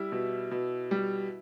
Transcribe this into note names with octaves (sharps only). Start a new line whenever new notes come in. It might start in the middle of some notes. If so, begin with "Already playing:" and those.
Already playing: G3 E4
B2
B2
G3